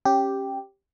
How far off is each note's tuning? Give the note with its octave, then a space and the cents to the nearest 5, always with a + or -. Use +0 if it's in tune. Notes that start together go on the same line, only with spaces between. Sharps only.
C#4 -20 G4 +0